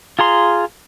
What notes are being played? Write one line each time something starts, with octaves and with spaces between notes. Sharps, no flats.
F4 G#4 A#5 C6